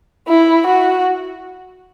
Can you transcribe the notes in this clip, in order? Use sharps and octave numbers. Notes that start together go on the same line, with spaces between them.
E4
F#4